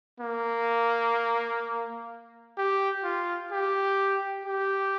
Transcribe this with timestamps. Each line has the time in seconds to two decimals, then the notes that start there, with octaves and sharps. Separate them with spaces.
0.20 A#3
2.58 G4
3.04 F4
3.52 G4
4.45 G4